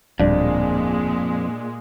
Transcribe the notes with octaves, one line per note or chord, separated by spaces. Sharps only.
D1 F2 A#2 G3 G#3 D4